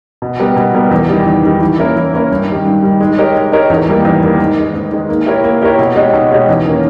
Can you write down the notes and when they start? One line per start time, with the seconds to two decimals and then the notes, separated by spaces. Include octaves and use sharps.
0.22 B2
0.40 G3 B3 G4 A#4
0.56 B2
0.74 G3 B3 G4 A#4
0.91 E2
1.09 D#3 G3
1.26 E2
1.43 D#3 G3
1.61 E3
1.78 A#3 C#4 E4 A#4
1.96 E3
2.13 A#3 C#4 E4 A#4
2.31 G2
2.48 D#3 G3
2.65 G2
2.83 D#3 G3
3.00 G#3
3.17 D#4 G4 A#4 C#5
3.35 G#3
3.52 D#4 G4 A#4 C#5
3.70 E2
3.87 D#3 G3 A#3
4.05 E2
4.22 D#3 G3 A#3
4.39 G#2
4.57 D#3 G#3
4.74 G#2
4.91 D#3 G#3
5.09 A#3
5.26 E4 G4 A#4 C#5
5.44 A#3
5.61 E4 G4 A#4 C#5
5.78 B2
5.96 G#3 D#4 G4 C#5
6.13 B2
6.31 G#3 D#4 G4 C#5
6.48 E2
6.65 D#3 A#3 C#4